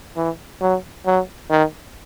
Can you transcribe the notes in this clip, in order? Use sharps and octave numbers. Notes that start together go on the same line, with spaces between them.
E3
F#3
F#3
D#3